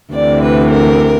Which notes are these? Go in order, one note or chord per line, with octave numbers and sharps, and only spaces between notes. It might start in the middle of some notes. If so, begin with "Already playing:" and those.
D2 C3 E3 D5
B4
A#4